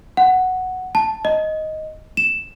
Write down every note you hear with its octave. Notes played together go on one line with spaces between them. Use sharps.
F#5
A5
D#5
E7